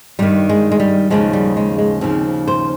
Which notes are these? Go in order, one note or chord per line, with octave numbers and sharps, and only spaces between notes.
G2 D#3 G3
G#3
G#3
G3
D#2 C#3 F3 G#3
G3
G#3
G#3
D#2 C#3 F3 C4
C5